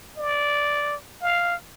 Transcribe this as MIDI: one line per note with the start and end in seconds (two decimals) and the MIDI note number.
0.17 0.95 74
1.21 1.55 77